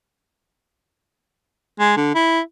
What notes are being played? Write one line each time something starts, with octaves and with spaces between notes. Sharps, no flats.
G#3
D3
E4